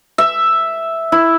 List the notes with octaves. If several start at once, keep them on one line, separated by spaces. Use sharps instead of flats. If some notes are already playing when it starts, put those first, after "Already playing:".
E5
E4